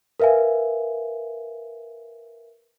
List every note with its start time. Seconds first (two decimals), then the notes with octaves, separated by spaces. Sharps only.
0.20 A#4 B4 E5 F5 G#5